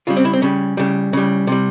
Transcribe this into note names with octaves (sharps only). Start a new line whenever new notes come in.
C#3 G3 F4
C4
E4
C4
C#3 G3 C#4
C#3 G3
C#3 G3
C3 G3